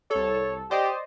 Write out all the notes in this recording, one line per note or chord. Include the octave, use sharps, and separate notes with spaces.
C2 A4 C#5
G4 C5 D5 D#5